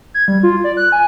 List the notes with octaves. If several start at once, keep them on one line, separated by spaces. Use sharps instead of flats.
G#6
G3
F4
D5
F#6
G#5